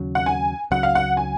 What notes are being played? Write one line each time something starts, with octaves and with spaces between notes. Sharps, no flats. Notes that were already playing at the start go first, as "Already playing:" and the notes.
Already playing: D#2 C#3 F#3
F#5
G#5
C#2 C#3 F#3 F#5
F5
F#5
G#5